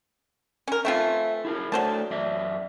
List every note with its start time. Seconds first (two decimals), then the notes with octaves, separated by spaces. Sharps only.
0.68 C#4 A#4
0.85 A3 C4 F4 E5 G#5
1.45 E4 G#4 A#4
1.72 F#3 A3 C5 D5 A5
2.11 F#2 D5 E5